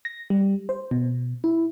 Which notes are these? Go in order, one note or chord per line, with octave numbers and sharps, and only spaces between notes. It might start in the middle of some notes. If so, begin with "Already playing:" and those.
A#6
G3
C5
B2
E4